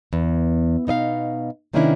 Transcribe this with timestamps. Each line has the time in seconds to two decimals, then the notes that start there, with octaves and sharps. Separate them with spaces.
0.13 E2
0.87 B2 D#4 D#5 F5
1.73 C3 D#3 A#3 C#4 D4 E4